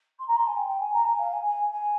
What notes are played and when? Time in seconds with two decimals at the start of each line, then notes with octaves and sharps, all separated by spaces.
0.19 C6
0.28 A#5
0.36 C6
0.46 G#5
0.56 G5
0.67 G5
0.79 G#5
0.93 A#5
1.05 G#5
1.18 F5
1.32 G#5
1.45 G#5
1.71 G#5